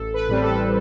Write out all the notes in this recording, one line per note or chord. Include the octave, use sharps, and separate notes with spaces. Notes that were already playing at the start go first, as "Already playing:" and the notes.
Already playing: A1 A4
B4
A2 G3 C4
A4